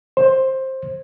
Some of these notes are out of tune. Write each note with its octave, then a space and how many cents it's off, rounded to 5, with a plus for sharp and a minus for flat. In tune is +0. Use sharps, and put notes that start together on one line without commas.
C5 +15